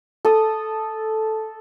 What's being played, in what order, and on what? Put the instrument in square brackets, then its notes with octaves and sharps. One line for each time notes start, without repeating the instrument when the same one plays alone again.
[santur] A4 D#6